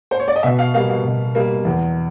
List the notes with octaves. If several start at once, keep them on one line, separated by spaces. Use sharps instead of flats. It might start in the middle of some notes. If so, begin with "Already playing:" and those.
C5
C#5
D5
D#5
B2 E5
F5
G3 A#3 F5
F5
B2
G3 A#3
E2